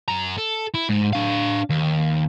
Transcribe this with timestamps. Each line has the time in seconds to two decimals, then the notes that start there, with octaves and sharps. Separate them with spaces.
0.08 F#2 A#5
0.38 A4
0.74 E4
0.89 G#2
1.13 D4 F5
1.70 D#2